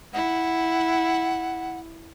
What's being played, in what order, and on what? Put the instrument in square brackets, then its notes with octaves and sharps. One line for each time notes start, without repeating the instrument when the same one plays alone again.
[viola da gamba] E4 [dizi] F#5